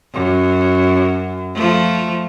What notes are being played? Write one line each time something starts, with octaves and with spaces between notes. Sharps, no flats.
F#2
F3 A3